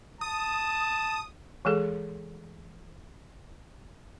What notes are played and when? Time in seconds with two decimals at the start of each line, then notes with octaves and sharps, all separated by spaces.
0.21 A5 D#6
1.65 E3 G#3 G#4 A4